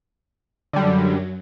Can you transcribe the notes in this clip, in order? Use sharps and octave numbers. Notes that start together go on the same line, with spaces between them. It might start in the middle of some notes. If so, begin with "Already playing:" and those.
F#2 D3 F#3 G3